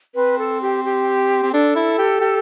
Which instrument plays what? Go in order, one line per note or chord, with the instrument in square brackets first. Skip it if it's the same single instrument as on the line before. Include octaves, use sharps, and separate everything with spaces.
[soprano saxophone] C4 [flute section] B4
[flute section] A4
G4
G4
[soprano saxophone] C4
[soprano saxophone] D4 [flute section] A4
[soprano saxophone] E4
G4
G4